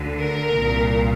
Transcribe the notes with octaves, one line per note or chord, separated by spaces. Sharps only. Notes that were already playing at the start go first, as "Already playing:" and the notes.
Already playing: D2 D3
A#4
C2 A#2